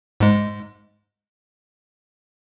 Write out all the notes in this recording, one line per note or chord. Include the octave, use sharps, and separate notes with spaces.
G#2 G#3